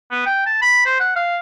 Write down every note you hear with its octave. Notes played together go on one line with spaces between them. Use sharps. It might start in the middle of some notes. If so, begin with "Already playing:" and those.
B3
G5
A5
B5
C5
F#5
F5